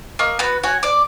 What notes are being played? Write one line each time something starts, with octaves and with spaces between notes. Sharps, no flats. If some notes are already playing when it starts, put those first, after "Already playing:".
A#3 D#5 C#6
B3 F#4 B4
F#4 C#5 G#5
D5 D6